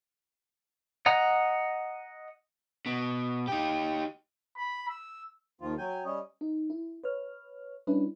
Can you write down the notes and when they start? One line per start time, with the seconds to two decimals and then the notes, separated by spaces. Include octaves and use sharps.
1.06 D#5 F#5 A#5
2.86 B2
3.48 D#4 G4
4.57 B5
4.88 E6
5.61 D#2 D#3 F3 F4
5.78 F#3 G5 G#5
6.05 G3 C#4 C#5 D#5
6.41 D#4
6.70 E4
7.04 B4 C#5 F6
7.87 G3 C#4 D4 E4 B4